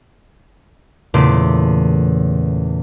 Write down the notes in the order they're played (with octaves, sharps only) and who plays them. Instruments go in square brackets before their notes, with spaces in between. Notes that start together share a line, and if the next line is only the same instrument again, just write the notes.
[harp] E2 A#2 C#3 A3 C6 D6